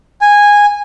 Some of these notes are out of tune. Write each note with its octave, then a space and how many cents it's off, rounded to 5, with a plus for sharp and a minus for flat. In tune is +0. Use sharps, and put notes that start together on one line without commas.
G#5 -10